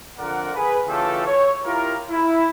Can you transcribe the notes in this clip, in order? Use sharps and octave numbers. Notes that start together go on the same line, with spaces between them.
F2 D3 F4 A#4 D5 F#5
G#4 B4
C#3 E3 A3 F4 G4 A4
C#5
E4 F4 G4 A#4
E4